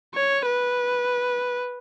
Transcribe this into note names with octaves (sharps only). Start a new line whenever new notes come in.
C#5
B4